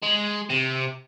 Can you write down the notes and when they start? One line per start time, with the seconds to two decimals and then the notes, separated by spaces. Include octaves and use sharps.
0.03 G#3
0.50 C3